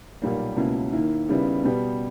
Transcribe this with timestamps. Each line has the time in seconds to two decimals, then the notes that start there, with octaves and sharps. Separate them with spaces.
0.22 B1 A#2 G3 A#3
0.57 C#2 B2 A#3 C#4 E4
0.92 D#2 D#3 A#3 E4
1.29 D#2 C#3 G3 B3 E4
1.63 B2 G3 B3